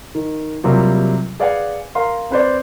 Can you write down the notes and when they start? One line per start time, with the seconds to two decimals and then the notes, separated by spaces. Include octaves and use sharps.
0.15 D#3
0.64 C3 F#3 G3 A#3 F4
1.40 G#4 B4 D5 F5 F#5 G#5
1.95 A#4 F5 A#5 C6
2.30 C4 B4 C5 D5